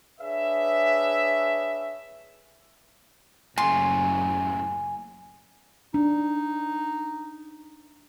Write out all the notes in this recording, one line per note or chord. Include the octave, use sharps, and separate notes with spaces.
D4 G#4 B4 C#5 E5
F#1 F#2 A2 C#3 G#5 C6
D4 D#4